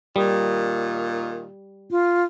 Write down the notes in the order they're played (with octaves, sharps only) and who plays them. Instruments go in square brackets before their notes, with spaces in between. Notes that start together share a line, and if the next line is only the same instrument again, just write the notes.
[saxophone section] A#2 D#3 F4 [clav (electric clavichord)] G3
[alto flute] F4